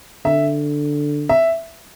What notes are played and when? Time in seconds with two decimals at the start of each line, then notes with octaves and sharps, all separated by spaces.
0.25 D3 E5
1.29 E5